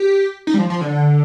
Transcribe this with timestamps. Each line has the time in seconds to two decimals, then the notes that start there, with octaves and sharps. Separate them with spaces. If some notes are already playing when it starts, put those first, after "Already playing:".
Already playing: G4
0.47 D#4
0.54 G3
0.58 F3
0.70 F3
0.81 D3